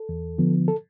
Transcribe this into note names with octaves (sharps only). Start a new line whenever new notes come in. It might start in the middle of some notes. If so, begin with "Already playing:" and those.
Already playing: A4
E2
D3 F3 B3
A4